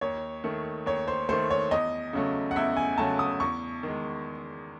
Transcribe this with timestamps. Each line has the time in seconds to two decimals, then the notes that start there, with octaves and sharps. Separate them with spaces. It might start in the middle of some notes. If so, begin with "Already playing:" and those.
0.01 D#2 C#5
0.44 D#3 A3
0.86 D#2 C#5
1.08 C5
1.29 D#3 A3 C5
1.50 C#5
1.71 E2 D#5
2.13 C#3 F#3 A3
2.51 F#5
2.56 E2 E5
2.77 G#5
2.98 C#3 F#3 A3 A5
3.19 D#6
3.40 E2 C#6
3.83 D#3 G#3